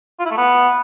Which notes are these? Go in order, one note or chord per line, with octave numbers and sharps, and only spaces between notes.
F4
E4
A3
B3